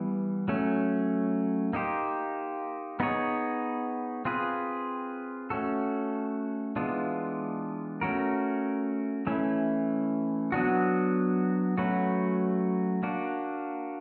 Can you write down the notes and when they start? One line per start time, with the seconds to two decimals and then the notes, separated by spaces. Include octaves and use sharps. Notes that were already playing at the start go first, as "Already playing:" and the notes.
Already playing: E3 G3 B3
0.48 F#3 A3 C#4
1.73 A#3 D#4 G4 C5
3.00 B3 D#4 G#4 C#5
4.25 C4 F4 G#4 B4
5.50 A3 C#4 F#4 A4
6.76 E3 G#3 B3 D4 F4
8.01 A3 C#4 F#4 A#4
9.27 E3 A3 C#4 E4
10.52 F#3 B3 D4 F#4
11.78 F#3 A3 C#4 F#4 B4
13.03 A#3 D4 F#4